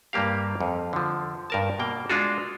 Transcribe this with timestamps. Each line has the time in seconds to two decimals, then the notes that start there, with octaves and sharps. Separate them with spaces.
0.13 G2 G3 A#3 G4 F5
0.60 F2
0.93 D3 F3
1.50 G2 A#4 A5
1.79 B2 A#3 G5
2.10 G#3 D4 F4 F#4